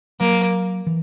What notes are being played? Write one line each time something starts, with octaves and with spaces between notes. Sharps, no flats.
F#3 A#3
E3